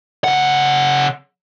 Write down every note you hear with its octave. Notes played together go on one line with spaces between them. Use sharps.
C#3 F#5